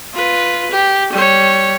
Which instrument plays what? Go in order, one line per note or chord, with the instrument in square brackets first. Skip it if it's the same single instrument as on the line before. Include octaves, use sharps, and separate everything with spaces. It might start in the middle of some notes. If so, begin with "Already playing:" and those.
[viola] F4 B4
G4
G3 C#5